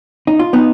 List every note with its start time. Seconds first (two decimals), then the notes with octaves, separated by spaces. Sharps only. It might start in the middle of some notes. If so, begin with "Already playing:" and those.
0.27 D#4
0.39 F4
0.53 B3 D#4